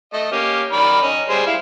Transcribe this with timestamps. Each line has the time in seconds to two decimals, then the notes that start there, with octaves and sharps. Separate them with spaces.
0.13 A3 D#5
0.32 A#3 C#4 G4
0.72 D#3 D5 B5
1.02 C#4 D#5
1.29 G3 G#4 C5
1.46 E4 F5